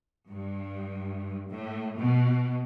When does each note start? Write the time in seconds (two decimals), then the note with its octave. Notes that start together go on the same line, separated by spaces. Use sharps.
0.28 G2
1.50 A2
1.98 B2